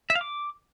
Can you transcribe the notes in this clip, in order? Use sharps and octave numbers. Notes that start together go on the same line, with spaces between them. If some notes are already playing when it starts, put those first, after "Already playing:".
E5
F5
D6